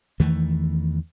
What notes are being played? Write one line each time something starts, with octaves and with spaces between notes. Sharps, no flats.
E2 D#3 E3 A3